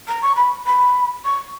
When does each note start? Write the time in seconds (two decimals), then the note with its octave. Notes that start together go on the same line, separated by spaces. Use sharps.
0.08 A#5
0.22 C#6
0.36 B5
0.66 B5
1.25 C#6